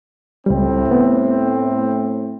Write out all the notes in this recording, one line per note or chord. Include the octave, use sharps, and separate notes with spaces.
C#2 A2 G3 C4
B3